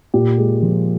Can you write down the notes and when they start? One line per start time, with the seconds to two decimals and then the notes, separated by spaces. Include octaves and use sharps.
0.14 A#2 G4
0.38 G#3
0.62 F3